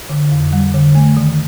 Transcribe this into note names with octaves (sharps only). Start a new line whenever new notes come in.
D3
F2
G3
D3
A3
D#3